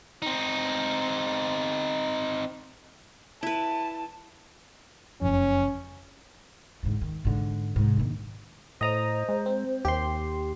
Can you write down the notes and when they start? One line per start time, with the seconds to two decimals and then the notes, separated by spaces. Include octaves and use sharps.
0.22 C4 D#4
3.43 E4 B4 A5
5.21 F#1 F2 C#4
6.83 G#2 D3
7.01 D#3
7.25 G#2 D3
7.76 G#2 C3
7.97 A#1 D#3
8.81 A2 C5 D#5 A#5 D#6
9.29 G#3
9.46 C4
9.85 D#2 G4 C6